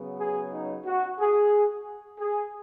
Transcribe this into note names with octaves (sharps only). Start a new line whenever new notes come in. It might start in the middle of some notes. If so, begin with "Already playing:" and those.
Already playing: C#3 F#3 B3
G#4
D#4
F#4
G#4
G#4